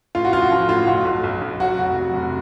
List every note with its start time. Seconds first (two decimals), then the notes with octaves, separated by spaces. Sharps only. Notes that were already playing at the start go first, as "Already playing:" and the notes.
0.15 A2 F4
0.25 F#4
0.33 A1 F4
0.42 F#4
0.51 F3
0.69 A2 F4
0.87 B1 F#4
1.05 B1
1.24 B1
1.42 B1
1.60 F#3 F#4
1.78 F1 F#4
1.96 F#3
2.14 F1